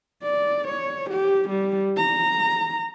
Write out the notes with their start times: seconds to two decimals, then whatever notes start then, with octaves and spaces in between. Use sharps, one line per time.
0.23 D5
0.68 C#5
1.10 G4
1.49 G3
1.97 A#5